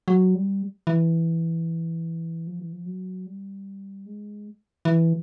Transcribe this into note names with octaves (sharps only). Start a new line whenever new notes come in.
F#3
G3
E3
F3
E3
F3
F#3
G3
G#3
E3